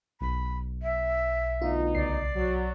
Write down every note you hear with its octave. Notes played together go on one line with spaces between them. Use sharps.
B1 B5
E5
D2 B3 D#4 F4
C#2 D5 C7
F#3